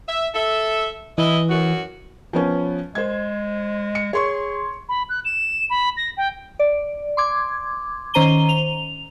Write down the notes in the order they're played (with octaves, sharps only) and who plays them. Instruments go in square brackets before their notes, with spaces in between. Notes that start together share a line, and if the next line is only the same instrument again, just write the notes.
[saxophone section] E5
A4 E5
[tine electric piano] E3 [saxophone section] E4 D#5
[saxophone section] F#2 F#4
[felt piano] F3 B3 C#4
[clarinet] G#3 [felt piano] C5 G#6
[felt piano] C#7
[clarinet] G#4 [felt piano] C#5 C6 C#6
[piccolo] B5
F#6
E7
B5
A#6
G5
[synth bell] D5
C6 D6 G#6
D#3 C#4 C5 A#5 D#7 G7
F7